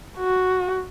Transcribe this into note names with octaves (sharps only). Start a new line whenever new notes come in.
F#4